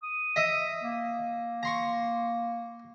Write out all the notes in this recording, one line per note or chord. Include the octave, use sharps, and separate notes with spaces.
D#6
D#5 E5
A#3
A#5 C6 C#6